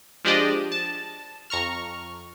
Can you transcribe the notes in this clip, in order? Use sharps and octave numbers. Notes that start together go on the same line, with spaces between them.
F3 G#3 D4 G4 D5 D#5
A5
F2 A#5 C#6 F6